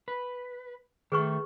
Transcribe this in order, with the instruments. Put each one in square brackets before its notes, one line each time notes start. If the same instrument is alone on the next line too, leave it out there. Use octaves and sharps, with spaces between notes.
[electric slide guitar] B4
[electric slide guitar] D#3 A3 [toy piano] G#4 B4 C#6